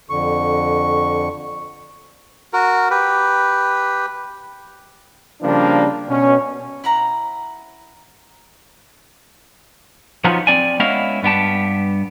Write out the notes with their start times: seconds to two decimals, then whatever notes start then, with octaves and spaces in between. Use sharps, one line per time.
0.10 F2 D3 C#6
2.53 F#4 A#4
2.90 G4 B4
5.42 C#3 F3 G3 A#3 D4
6.09 B2 C#4
6.84 E4 F#5 A#5
10.24 F3 F#3 B3 C#4 D#4 F4
10.47 C4 D5 G#5
10.80 G#3 B3 C#4 E4 D#5 F5
11.23 G2 B3 G4 A5